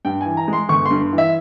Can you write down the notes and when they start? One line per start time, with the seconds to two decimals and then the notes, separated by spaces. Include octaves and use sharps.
0.05 G2 G5
0.21 E3 G#5
0.37 A#5
0.48 G#3
0.53 C6
0.69 G1 C#6
0.86 G2 C6
1.13 E3
1.18 E5